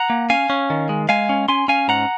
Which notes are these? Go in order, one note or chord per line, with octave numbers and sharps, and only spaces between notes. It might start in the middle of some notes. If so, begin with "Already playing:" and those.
Already playing: F#5 A#5
A#3
C#4 F5 G#5
C#4
D#3
G#3
G#3 F5 G#5
C#4
C#4 G#5 C6
C#4 F5 G#5
G#2 F#5 A#5